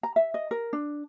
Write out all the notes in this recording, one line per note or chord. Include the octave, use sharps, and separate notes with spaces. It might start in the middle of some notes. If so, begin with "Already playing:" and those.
A#5
E5
D#5
A#4
D4